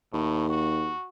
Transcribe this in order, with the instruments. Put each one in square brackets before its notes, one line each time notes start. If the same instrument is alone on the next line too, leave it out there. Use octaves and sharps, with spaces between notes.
[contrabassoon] D#2 [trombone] A2
[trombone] F#4